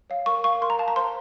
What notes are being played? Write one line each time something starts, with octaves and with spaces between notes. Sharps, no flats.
C#5 F5
A#4 C#6
F5 C#6
A#4 C6
A#5
F5 A5
A#5
C5 C6